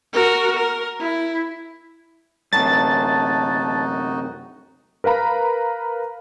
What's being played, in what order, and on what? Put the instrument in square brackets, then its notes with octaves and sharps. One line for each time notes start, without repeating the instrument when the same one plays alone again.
[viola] F#4 A#4
A#4
E4
[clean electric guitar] F#2 C3 [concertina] D#4 F#4 [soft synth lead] A5 [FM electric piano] A6
[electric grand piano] A#4 B4 F5 A#5 B5